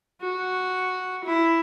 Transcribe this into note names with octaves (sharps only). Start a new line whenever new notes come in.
F#4
E4